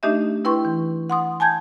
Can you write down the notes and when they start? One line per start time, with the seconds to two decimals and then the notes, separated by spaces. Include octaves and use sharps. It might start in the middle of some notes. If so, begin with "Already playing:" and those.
0.03 A3 D4 D#4 G4 D#5 E5
0.45 E4 B4 G5 C6 C#6
0.65 E3
1.10 F#5 C6 D#6
1.40 G#5 A5 G6 G#6